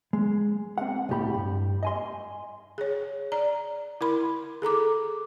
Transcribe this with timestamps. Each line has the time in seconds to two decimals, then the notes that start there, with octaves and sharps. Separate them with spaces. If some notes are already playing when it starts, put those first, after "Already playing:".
0.13 G#3
0.78 C4 F#5
1.09 C2 A2 G4 B5
1.34 G2
1.83 D#5 G#5 C6
2.78 G#4 C#5
3.32 D5 A#5
4.01 E4 A#4 B5 C6
4.62 G#4 A4 A#5 D6